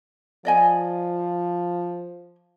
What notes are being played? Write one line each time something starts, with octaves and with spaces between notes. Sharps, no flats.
F3 D5 D#5 G#5